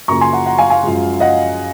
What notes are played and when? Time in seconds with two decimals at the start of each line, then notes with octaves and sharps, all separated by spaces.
0.08 F#2 C#3 F3 A#3 A#5 C#6
0.21 G#5 C6
0.33 F#5 A#5
0.46 F#5 A#5
0.58 F5 G#5
0.70 F5 G#5
0.83 F#2 F3 G#3
1.20 D#5 F#5